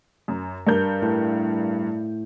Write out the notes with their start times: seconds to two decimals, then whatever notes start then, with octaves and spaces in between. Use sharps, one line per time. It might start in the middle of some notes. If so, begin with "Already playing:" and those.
0.28 F#2
0.67 G2 A#4 G6
1.02 A2